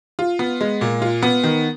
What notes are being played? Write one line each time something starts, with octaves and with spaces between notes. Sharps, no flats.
F4
B3
G#3
A#2
F4
B3
D#3